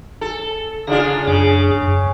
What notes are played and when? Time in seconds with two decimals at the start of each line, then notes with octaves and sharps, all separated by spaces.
0.21 A4
0.87 C#3 D4 F4 G#4 A#5
1.28 F#2 C#3 D4
1.82 F#2